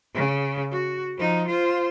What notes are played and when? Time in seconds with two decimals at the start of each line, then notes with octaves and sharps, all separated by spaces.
0.14 C#3
0.71 F#4
1.17 F3 D#4
1.47 F4 C5